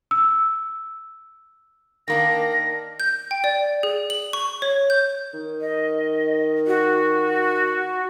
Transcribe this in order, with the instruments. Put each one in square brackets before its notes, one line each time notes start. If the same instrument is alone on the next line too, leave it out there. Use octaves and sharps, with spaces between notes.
[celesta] E6
[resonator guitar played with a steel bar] D#3 A#3 D4 [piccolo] A#6
[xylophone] G6
G5
D5
G#4
F#7
C#6
C#5
G6
[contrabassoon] D#3
[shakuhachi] D#5
F#4